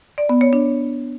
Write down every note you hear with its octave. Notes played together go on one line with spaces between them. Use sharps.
D5
B3
C#5
D4